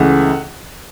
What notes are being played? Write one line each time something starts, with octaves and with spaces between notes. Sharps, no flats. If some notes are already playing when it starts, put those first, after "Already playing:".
Already playing: C#2 C#3 E3 A3 F#5